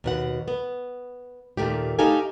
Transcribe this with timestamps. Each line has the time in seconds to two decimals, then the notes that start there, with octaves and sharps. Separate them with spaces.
0.04 D#2 B2 F#5
0.48 B3
1.57 D#2 A#2 A3 G4
1.99 A3 D#4 G4 A4 F5 G#5